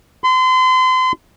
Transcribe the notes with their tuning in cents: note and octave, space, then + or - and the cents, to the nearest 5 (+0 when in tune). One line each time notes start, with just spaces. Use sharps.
C6 -35